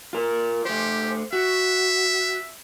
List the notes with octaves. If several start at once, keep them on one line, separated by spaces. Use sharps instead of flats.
F4 A#4
A3 G4 C5
F#4 E5